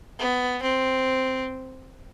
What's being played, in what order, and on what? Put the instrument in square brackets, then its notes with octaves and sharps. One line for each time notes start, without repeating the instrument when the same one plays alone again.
[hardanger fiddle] B3
C4